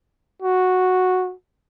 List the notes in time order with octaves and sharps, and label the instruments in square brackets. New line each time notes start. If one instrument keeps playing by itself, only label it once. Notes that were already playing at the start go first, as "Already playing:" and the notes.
[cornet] F#4